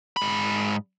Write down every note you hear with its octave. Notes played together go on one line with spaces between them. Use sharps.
G#2 B5